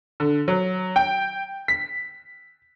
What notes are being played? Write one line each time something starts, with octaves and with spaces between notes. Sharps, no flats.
D3
F#3
G5
B6